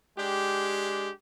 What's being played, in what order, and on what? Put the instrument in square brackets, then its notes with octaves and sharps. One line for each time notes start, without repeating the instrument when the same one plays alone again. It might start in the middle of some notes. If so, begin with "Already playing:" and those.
[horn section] G#3 D4 G4